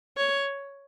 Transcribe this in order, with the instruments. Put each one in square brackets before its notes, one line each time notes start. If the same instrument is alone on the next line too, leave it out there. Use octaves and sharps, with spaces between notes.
[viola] C#5